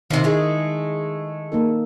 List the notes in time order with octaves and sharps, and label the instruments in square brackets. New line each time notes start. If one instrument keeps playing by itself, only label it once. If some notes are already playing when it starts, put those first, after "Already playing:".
[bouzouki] C3 F3 [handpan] D#3 D#4
[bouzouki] G#3 A3 [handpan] E4 G#4
[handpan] A#3 D#4 A4